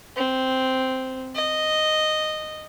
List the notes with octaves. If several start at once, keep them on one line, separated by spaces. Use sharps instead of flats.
C4
D#5